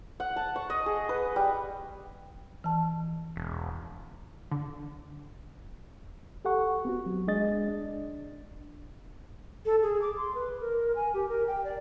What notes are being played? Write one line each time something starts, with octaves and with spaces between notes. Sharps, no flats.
F#5
A5
C#6
D#5
G#4
B4
G3
E3 A5
E1
D3
G4 A4 F#5 C#6
B3 C4 F#4
F#3
G#3 D4 G#4 D#5 A6
D4
A4
G#4
D6
C6
B4
A#4
G#5
G4
A#4
G5
D5